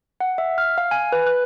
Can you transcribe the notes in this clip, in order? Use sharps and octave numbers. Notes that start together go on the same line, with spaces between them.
F#5
E5
F6
F5
G#5
B4
F#6